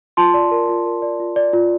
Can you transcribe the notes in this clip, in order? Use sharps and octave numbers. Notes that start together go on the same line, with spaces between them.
F4 A5 C6
D5
A#4
F4
A#4
D5
F4
D5
F4